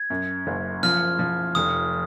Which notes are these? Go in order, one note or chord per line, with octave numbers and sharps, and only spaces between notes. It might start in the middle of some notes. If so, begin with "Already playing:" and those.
Already playing: G#6
F#2
F#1
F3 F6
F3
F1 D#6